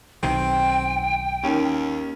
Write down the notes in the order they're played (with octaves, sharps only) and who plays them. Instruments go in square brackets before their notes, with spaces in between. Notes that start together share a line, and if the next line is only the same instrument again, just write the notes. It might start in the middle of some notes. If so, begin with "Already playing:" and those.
[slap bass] B1 D#3 [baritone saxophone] C4 [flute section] G5
[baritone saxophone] D#2 [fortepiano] D#3 C#4